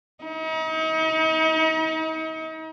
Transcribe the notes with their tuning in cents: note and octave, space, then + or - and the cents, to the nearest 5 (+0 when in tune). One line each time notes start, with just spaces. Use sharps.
D#4 +40